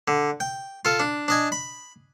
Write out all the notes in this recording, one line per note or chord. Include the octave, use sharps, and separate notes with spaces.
D3
G5
F4 A4
D4
D4 D#5 G#5
B5